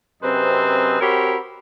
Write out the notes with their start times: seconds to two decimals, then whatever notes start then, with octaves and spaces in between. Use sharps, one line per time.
0.23 F#2 C3 C4 B4 C5 D#5
1.01 C4 F#4 G4 A#4 C#5 B5